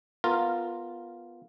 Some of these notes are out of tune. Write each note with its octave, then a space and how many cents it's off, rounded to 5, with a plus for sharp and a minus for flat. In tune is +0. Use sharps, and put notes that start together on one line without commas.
B3 +0 F4 +0 A#4 -15